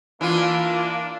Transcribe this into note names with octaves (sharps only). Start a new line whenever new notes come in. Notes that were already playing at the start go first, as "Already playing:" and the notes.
E3 A#3 D4 F4